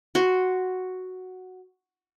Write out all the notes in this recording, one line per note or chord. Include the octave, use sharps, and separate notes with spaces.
F#4 C6